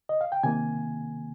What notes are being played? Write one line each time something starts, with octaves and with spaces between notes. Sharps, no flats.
D#5
F5
G5
C3 D#3 A#3 G#5